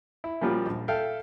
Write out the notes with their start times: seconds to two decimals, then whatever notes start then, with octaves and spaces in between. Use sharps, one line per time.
0.24 E4
0.41 A#2 F3 G3 C#4 F4 F#4
0.66 A#1
0.88 A4 E5 F5 G5